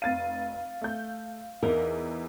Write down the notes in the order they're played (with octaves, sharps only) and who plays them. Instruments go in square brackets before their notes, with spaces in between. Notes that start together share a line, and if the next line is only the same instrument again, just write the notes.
[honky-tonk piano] F1 A6 D#7 [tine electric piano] F5
[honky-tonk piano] A3 G6
[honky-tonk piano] E2 [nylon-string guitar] E3 D#4 A#4